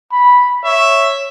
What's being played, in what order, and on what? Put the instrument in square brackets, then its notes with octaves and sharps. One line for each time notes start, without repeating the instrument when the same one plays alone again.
[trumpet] B5
[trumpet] C#5 [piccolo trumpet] E5